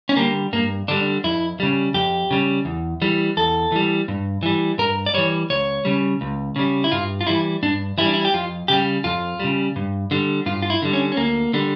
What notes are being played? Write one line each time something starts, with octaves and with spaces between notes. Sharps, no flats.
C#4
D3 G3 A#3
G2 A#3
D3 G3 D4
F2 E4
C#3 G3
F2 G4
C#3 G3
E2
E3 G3
E2 A4
E3 G3
G2
E3 G3
G2 A#4
D5
E3 G3 C#5
C#2 C#5
C#3 G3
C#2
C#3 G3
E4
G2 F4
F4
E3 G3 E4
G2 D4
E3 G3 E4
D4
E4
G4
F2 F4
C#3 G3 G4
F2 F4
C#3 G3
G2
D3 G3
G2 F4
F4
E4
D3 G3
C#4
C#4
D2 A#3
D3 G3